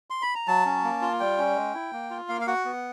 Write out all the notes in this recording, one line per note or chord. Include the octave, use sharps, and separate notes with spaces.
C6
B5
A#5
F#3 A5
C#4
A#3
F4
G3 G5
C#4
G#3
E4
A#3
F4
A#3 F5
F5
F#4 F#5
B3